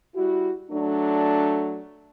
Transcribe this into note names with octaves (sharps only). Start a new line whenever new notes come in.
G3 E4 F#4
F#3 A3 D4